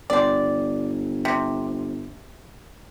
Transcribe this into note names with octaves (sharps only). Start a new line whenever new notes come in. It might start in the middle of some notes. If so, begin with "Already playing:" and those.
G1 C4 D5
C3